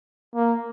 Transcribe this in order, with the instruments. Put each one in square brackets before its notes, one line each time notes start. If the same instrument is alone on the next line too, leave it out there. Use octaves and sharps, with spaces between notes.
[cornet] A#3